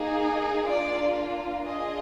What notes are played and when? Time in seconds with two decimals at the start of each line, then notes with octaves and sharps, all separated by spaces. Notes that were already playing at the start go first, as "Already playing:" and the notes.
Already playing: A#3 D#4 G#4
0.67 A#3 D4 F4 D5
1.66 D4 F4 G#4 D#5